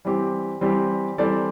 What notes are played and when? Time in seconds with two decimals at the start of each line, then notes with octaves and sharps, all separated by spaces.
0.05 E3 G3 C4 G4
0.61 E3 G3 C4 G4
1.18 E3 G3 C4 A4 D5